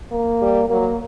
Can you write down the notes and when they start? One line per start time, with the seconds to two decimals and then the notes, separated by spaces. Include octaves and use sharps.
0.12 A#3
0.41 G3
0.69 F#3 A#3